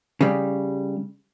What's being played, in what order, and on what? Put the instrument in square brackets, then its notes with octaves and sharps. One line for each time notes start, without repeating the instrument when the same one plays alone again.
[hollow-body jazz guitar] C#3 G3